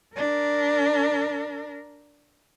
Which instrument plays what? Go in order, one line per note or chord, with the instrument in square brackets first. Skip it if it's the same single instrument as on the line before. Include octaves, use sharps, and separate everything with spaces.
[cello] D4 A#4